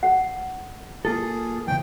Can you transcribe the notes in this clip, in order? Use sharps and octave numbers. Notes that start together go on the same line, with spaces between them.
F#5
A#3 F4 G#4 A4
E2 C#3 G5